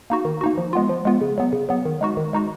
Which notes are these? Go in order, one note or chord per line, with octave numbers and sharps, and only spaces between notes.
A#3 D#4 F#4
D#3
A#3 D#4 F#4
F3
G#3 B3 F4
F3
G#3 B3 F4
C#3
F#3 B3
C#3
F#3 B3
D#3
G#3 D#4 F#4
D#3
G#3 D#4 F#4